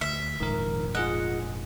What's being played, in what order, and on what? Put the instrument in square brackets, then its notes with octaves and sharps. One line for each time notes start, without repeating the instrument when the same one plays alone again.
[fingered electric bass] D2 [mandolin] E5
[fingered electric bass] F1 A#1 G#2 [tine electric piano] D#3 A#4
[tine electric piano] F4 G#4 D#5 [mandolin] F#5